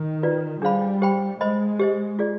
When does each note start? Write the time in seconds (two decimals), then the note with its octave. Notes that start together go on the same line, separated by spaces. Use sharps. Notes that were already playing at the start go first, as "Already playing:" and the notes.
Already playing: D#3
0.23 F4 B4 D5
0.62 G3 D4 G#4 C5 F5 B5
1.02 G4 C5 G5 B5
1.40 G#3 C5 D#5 B5
1.79 G4 C5 D#5
2.19 F4 G#4 D5